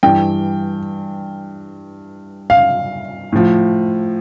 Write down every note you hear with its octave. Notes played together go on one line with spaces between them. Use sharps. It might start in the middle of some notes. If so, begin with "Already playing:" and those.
G2 E3 G5
F5
A2 F3